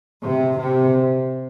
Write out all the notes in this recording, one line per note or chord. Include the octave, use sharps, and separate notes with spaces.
C3
C3